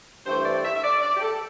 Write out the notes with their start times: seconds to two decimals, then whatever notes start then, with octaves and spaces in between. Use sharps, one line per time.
0.26 G2 E3 A3 C5
0.45 D5
0.64 E5
0.74 E5
0.83 D5
1.02 D5
1.15 G4
1.21 A4